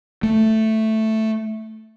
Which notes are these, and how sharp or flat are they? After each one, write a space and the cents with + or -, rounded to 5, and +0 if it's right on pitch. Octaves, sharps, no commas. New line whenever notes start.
A3 +0